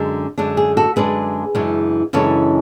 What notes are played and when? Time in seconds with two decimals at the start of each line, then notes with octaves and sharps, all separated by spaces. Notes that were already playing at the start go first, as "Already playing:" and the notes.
Already playing: F#2 D3 G#3 D4
0.38 F#2 D3 G#3 D4
0.57 G#4
0.77 F#4 A4
0.96 F#2 D3 G#3 D4 G#4 B4
1.55 F#2 C#3 E3 G#3 D4
2.13 F#2 C#3 E3 G#3 D4 A4 C#5